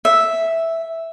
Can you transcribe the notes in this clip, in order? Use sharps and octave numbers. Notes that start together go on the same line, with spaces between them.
E5